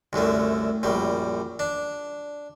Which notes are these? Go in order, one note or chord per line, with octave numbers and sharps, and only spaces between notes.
C2 F#2 D3 A3
A#1 F#2 G3
D4